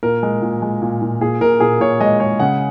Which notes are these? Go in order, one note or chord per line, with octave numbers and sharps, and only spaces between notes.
A#2 A#4
G#3
A#2
G#3
A#2
A#2
A#2 G#4
A#2 A#4
A#2 G#4
A#2 C#5
G#3 D#5
G#3 C#5
C#3 F#5